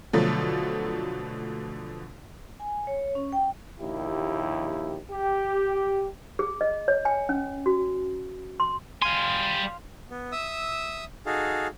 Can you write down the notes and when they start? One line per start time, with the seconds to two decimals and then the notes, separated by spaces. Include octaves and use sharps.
0.13 B2 D3 F3 F#3 A3
2.60 G#5
2.87 C#5
3.15 C#4
3.33 G5
3.80 A#1 D#2 E4 G4
5.11 G4
6.39 G#4
6.61 D#5
6.88 C#5
7.05 G#5
7.29 C#4
7.66 F#4
8.60 C6
9.02 G3 F5 G#5 C6
10.11 B3
10.32 E5 D#6 E6
11.26 D#4 F#4 G#4 A4 F5